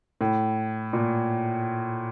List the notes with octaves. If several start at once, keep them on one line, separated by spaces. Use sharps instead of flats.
A2
A#2